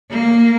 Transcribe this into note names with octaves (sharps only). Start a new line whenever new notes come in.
A#3